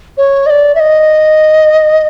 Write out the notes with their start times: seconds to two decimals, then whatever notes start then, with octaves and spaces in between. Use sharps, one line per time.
0.17 C#5
0.46 D#5
0.50 D5
0.75 E5
0.80 D#5